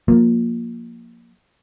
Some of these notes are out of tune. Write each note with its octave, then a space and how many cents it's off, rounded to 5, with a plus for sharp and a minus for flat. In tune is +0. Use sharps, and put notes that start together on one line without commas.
F3 +25 A#3 +5